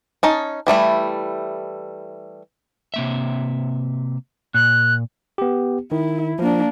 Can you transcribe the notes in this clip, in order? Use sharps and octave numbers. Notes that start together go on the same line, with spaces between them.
C#4 D#4 A5
E3 G3 A3 E4
C3 A#3 E5
A#2 F#6
B3 G4
D#3 E4
F3 A#3 D4